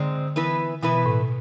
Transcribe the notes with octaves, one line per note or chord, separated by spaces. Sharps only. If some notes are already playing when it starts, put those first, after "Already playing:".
Already playing: G#2 D3 G#3 C4
E3 B3 E4 B4
B2 E3 B3 E4 B4
B2
A2